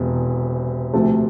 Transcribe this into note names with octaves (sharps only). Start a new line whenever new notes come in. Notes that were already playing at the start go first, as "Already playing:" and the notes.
Already playing: E1 E2 C3
D2 C3 F3 A3